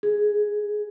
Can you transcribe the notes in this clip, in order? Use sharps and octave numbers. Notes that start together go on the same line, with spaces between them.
G#4